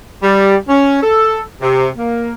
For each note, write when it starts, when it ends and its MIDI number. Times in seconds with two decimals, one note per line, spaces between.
0.23 0.56 55
0.69 1.00 61
1.03 1.41 69
1.61 1.87 48
1.97 2.33 58